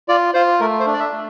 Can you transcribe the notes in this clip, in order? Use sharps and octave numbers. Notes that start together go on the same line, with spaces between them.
F4 D5
F4 C5
A3 A#4
C5
D4
D5
E5
A3